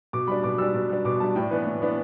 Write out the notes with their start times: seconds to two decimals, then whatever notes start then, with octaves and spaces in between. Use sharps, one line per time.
0.13 B2 D6
0.28 G3 D4 B5
0.43 B2 D6
0.58 G3 D4 E6
0.74 B2
0.90 G3 D4
1.05 B2 D6
1.20 G3 D4 A5
1.35 A2 G5
1.51 E3 B3 D4 B4
1.66 A2
1.81 E3 B3 D4